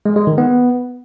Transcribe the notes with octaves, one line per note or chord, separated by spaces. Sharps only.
G#3
G#3
D#3
B3